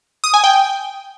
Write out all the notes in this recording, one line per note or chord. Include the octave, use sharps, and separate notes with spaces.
D#6
G#5
G5